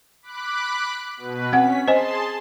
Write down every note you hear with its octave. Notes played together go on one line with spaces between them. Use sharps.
B5 D6 F#6
B2 B4
C4 C#4 F#5 B6
G#4 C5 D#5 G#5 A5 C6